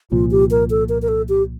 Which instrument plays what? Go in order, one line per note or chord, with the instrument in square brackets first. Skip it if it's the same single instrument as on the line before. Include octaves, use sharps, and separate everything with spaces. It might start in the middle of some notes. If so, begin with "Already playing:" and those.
[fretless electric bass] C2 A#2 F3 [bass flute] F4
[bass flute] G4
A#4
A4
A#4
A#4
A4
G4